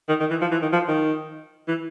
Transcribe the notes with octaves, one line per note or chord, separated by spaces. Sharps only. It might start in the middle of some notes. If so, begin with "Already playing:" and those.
D#3
D#3
E3
F3
E3
D#3
F3
D#3
E3